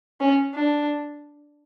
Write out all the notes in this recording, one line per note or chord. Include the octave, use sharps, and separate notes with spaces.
C#4
D4